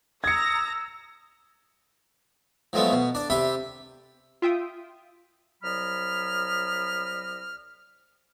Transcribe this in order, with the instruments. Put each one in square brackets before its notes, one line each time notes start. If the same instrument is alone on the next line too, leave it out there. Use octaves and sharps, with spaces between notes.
[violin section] A#5 A#6 [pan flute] D#6 [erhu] E6 [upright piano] G#6 C#7
[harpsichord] F3 F#3 G#3 A3 B3
B2
D4 D5
C3 G4 E5 B5
[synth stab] F4 E5 G5 D#6
[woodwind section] C2 F#3 D#5 B5 F6